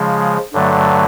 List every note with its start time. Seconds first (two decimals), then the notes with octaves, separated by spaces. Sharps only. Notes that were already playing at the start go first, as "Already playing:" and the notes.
Already playing: C#3 F3 G#3
0.53 G2 D3 F#3 A3